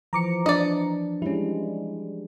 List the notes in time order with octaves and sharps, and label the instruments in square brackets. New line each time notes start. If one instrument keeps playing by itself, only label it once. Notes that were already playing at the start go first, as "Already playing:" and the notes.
[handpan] E3 F3 [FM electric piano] A#5 D6 C#7
[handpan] D4 [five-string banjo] D5 D#5
[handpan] G3 G#3 [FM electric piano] C#4 E4